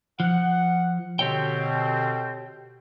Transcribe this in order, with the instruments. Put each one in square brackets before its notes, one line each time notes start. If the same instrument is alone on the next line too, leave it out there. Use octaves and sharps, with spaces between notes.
[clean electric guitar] F3 [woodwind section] F#5
[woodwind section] B2 D3 C4 [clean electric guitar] G4 C#5 G5